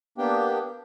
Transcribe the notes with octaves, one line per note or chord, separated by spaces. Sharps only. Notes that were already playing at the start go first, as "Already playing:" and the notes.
A#3 B3 D4 G4 G5